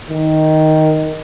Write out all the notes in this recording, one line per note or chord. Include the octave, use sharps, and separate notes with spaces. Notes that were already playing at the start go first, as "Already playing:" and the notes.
D#3